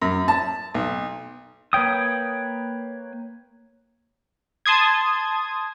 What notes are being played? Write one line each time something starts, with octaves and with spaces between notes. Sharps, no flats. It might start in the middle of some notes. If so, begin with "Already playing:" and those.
F#2
A5
B1
A#3 B4 C#5 G5 D#6
A5 C6 D#6 G#6